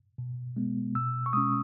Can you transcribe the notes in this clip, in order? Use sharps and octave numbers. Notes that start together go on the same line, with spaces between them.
B2
G#3 B3
B2 E6
C#6
G#3 C#4 D#6